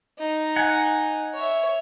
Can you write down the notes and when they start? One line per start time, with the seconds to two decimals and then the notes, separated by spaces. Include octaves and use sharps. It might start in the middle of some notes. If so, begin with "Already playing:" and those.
0.19 D#4
0.56 F#5 G#5
1.34 C#5 E5